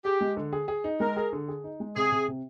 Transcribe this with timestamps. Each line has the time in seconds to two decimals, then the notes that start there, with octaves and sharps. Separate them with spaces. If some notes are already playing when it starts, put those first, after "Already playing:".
0.04 G4 G#4
0.21 G#3
0.37 D3
0.53 G#4
0.68 G#4
0.84 D#4
1.00 G#3 A#4
1.16 G#4
1.32 D3
1.48 G#4
1.64 D#4
1.80 G#3
1.96 C3 G#4
2.12 C3
2.28 C3